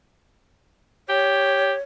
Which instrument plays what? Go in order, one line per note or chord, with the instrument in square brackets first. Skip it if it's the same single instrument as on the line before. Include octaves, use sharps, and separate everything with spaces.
[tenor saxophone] G4 [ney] C#5